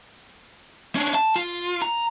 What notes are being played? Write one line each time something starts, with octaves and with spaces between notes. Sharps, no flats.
C#4 D4
A5
F4
A#5